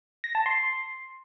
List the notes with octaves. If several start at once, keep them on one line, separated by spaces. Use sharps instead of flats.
A#6
A5
C6